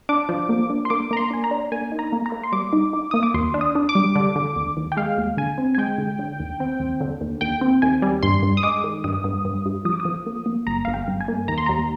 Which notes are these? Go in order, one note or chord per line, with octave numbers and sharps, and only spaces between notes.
D4 D6
F3
A#3
D4
C6
A#3 D6
A#3 A#5
C6
D4 G#5
A#5
D4
A#3 G#5
D#4
A#5
A#3
A#5
A#3
C6
G3 D6
D#4
D#4
A#3 D#6
D6
D#2 C6
D4
D#6
D4
D6
G3
D3
D3
D#2
D#2
G5
G#3 F5
D#2
D3 G#5
C4
G#5
G#3 G5
D3
D3
D#2
C4
D#2
D3
D#2
D#2 G5
C4
D#2 G#5
G3
G2 C6
G2
D#6
G#3 D6
D#3
G2 D#6
G2
G2
G2
F3 D#6
D6
D#6
F3
A#3
A#3
G1 A#5
G1 F5
G5
G2
G#5
A#3
D#2 A#5
C6
D#2 A#5